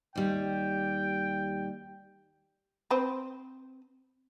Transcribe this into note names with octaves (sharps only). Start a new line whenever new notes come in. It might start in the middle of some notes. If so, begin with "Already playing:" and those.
D#2 G3 G5
C4 B4